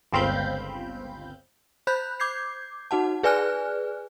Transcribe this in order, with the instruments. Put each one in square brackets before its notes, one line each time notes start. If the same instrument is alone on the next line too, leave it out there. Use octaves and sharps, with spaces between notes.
[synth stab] G1 C#2 C4 F5 B5 G6
[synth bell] C5 B5 F#6 G6
D6 G6 G#6 C7
D#4 F#4 F#5 A5
G#4 B4 D5 G#5 F6 F#6